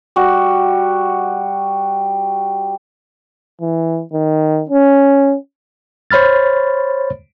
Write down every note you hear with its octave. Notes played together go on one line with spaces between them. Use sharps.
G3 F#4
E3
D#3
C#4
C5 C#5 B5 F6 A6